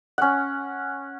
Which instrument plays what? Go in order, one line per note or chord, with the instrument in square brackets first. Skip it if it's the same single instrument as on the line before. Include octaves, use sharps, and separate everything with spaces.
[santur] C#4 F#5